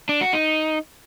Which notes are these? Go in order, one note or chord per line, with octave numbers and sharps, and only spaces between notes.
D4
F#4
D#4